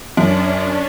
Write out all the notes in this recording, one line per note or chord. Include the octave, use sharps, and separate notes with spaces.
F#2 C#4 D4